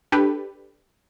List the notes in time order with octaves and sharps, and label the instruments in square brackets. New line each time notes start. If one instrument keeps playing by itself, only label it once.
[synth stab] D4 G4 A4 B4